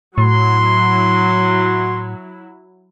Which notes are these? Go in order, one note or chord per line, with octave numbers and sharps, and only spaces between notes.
A2 F#3 E4 C6